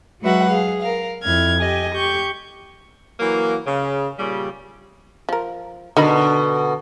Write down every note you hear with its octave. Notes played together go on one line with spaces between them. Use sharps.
F#3 G#3 F#4 B4 E5 F#5
G#4 F5
A#4 F5
F2 E4 F6 G#6
G4 D#5 G#5
G4 C#6 G6
E3 F#3 A#3
C#3
A#2 C#3 G3
F3 A#4
B2 D3 D#4 A#4 B5